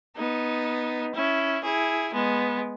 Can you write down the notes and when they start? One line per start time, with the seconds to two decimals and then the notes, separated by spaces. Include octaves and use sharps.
0.17 B3 D#4
1.14 C#4 E4
1.63 E4 G#4
2.13 G#3 B3